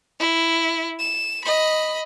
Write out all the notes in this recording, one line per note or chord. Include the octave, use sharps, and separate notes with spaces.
E4
E7
D#5 B5